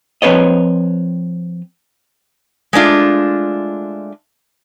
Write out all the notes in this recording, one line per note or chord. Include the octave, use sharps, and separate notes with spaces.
F3 C4 B4 C#5 D#5
G#3 A3 D4 F4